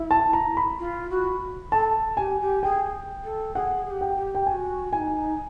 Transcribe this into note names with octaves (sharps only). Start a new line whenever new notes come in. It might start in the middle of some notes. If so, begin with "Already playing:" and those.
Already playing: E4
A5
A#5
B5
F4
F#4
A4 A5
G4 G#5
G4
G#4 G5
A4
G#4 F#5
G#4
G4
G5
G4
G5
G4 G#5
F#4
E4 G#5
D#4